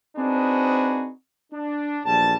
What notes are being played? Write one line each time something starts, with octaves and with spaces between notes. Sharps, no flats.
C4 D4 D#4 F#4 G#4 B4
D4
A#1 E2 G3 A5